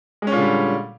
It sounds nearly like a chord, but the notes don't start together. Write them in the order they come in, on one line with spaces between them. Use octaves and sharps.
G#3 C#4 A#2 D3 G3